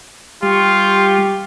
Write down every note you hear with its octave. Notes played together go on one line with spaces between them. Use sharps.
G3 F4 G4 C6 C#6